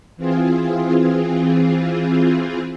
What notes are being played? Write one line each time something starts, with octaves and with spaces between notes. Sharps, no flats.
E3 C4 F4 G#4